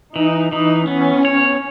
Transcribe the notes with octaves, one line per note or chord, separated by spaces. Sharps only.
E3 D#4
E3 D#4
B3 C#4
C#5